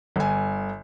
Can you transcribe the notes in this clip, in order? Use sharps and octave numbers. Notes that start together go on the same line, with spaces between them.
G1 G#5